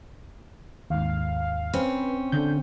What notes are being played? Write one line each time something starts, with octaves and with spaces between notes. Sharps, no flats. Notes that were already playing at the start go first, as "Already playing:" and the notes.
D#2 G#2 F5
C4 C#4 B4
D3 G6